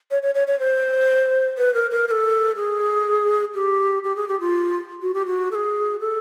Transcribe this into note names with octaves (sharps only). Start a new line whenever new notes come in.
C#5
C#5
C#5
C#5
C5
B4
A#4
A#4
A#4
A4
G#4
G4
G4
G#4
G4
F4
F#4
G4
F#4
A4
G#4
A4